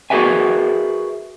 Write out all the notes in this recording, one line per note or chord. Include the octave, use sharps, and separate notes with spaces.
F#4 G#4 A#4 B4 E5 G#5